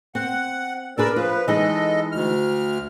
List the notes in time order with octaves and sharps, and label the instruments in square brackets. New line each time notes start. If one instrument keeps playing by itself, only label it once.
[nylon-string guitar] C4 [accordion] F#5
[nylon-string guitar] D4 G#4 B4 [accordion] A#4 D5 E6
[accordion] F3 B4 [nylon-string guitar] F4
[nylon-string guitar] E3 G#3 D#4 [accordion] A4 D#5
[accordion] D2 F6